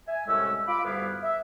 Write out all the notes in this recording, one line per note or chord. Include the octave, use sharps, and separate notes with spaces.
E5 G#5
C2 A2 G#3 A3 C#4 E6
F4 B5 D6
D2 G2 G3 B3 E4 F5
E5